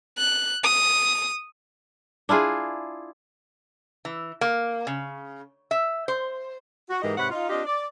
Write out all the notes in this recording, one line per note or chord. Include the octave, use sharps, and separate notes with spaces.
F#6
D#6
D4 E4 F4 G#4
E3
A#3
C#3
E5
C5
F#4
G#2 E3 G#3 G4 A#4 D#5
G#2 C3 B4 C#5 F#5
D#4 F4
C4 D4 F4 G4 D#5
D5